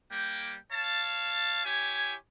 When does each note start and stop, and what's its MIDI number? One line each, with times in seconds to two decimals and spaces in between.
0.11 0.56 55
0.11 0.56 58
0.11 0.56 79
0.73 1.64 73
0.73 1.64 77
0.73 1.64 81
1.65 2.14 64
1.65 2.14 67
1.65 2.14 73
1.65 2.14 80